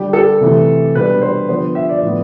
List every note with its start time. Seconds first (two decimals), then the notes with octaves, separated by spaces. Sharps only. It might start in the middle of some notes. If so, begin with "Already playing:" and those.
Already playing: D3 G3 D4 G4
0.13 A4
0.41 C3 E3 A3
0.95 B2 G3 D4 B4
1.22 C5
1.48 D3 F3 B3 C5
1.75 E5
1.89 D5
2.02 A2 F3 B3